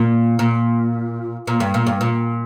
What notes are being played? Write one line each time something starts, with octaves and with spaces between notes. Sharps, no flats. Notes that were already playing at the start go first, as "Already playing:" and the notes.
Already playing: A#2
A#2
A#2
G2
A#2
G2
A#2